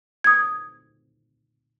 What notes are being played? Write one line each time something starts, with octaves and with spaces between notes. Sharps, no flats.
D#6 G#6